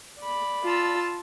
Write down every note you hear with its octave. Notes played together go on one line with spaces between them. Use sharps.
D5 B5
F4 A5 E6